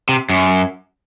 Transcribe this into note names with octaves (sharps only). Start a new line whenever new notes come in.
C3
F#2